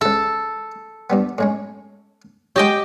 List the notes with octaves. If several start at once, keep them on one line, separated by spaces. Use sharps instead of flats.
C#2 E4 A4
G2 G3 B3
A2 G#3 C#4
G#3 G4 C#5 D#5 G5